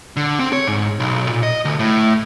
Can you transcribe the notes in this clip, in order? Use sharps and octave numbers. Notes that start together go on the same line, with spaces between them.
D3
C4
C#5
G#2
B1
A#2
D#5
D2
A2